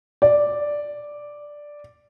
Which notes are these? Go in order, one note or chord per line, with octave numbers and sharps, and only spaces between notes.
D5